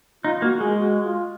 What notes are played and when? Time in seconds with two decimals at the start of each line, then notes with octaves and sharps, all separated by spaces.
0.25 D#4 F4
0.42 A#3 F#4
0.60 G#3 G#4
0.77 F#4
1.04 F4